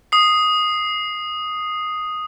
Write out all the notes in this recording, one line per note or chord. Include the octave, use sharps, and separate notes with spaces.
D#6 C7